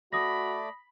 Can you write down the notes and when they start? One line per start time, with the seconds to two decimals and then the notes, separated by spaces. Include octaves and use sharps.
0.13 A3 F#4 D5 B5 D#6 A#6